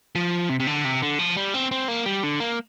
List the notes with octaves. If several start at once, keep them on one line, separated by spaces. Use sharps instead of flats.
F3
C3
C3
D3
C3
D3
F3
G3
C4
C4
A#3
G3
D3
A#3